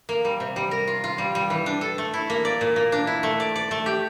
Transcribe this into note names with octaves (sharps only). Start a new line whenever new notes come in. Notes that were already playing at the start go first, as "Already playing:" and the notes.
A#3
G3
C3
G3
A#4
F4
F4
G3
G3
E3
D4
A4
A3
E4
A#3
D5
A#2
A#3
D4
E4
A3
D5
D5
A3
G4